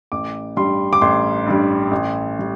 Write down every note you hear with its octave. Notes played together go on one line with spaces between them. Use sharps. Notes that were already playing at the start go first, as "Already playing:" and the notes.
A1 D6
G2 G3 C6
D6
A1 C6
G2 G3
A1
G3